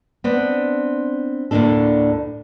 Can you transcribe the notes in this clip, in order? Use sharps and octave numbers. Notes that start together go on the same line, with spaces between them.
B3 C4 D4
D2 A2 D3 A#3 D4 A4